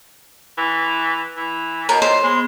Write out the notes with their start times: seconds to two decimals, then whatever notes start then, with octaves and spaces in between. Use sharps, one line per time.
0.58 E3
1.37 E3
1.89 B2 A#4 C#5 D#5
2.02 A#2 C5
2.23 G#3 B3 G#4